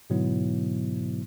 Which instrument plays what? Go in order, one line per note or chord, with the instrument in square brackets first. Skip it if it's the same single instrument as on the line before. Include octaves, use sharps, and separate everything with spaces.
[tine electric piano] G#2 B2 D3 F#3 B3 E4